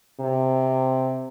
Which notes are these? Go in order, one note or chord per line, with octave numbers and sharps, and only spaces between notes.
C3